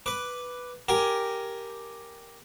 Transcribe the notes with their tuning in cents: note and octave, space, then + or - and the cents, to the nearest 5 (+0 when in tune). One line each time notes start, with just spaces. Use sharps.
B4 +0 D6 +0
G4 +0 A#4 +0 G#5 +10